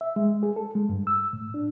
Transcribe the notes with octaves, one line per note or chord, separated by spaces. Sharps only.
E5
G#3
G#4
A4
G#3
G2
E6
A2
D4